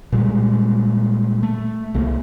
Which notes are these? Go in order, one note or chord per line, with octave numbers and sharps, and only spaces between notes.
A#2 G3 G#3
A3
C2 A3 A#3